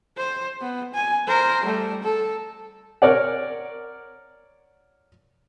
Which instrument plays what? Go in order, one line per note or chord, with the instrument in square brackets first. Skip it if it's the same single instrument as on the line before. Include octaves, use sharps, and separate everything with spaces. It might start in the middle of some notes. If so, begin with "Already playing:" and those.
[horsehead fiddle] C5
B3
G#5
A#4 C5
G3 A3
A4
[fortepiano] A#4 C#5 D5 F#5